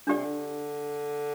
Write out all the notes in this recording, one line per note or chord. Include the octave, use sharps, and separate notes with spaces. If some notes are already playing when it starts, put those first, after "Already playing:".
D3 D4 G4 D5
C3
D3